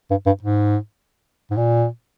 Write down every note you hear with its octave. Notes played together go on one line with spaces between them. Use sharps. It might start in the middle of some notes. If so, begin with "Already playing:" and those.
G2
G2
G#2
G#2
A#2